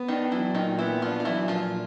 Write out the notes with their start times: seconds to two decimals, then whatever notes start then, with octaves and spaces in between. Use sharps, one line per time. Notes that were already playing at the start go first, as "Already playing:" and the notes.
Already playing: B3
0.08 D#3 D4 D#4
0.32 E3 F#3 E4
0.54 A#2 D#3 D#4
0.79 E3 B3 E4
1.02 F3 D4 F4
1.20 F4
1.25 E3 F#3 E4
1.48 A#2 F3 F4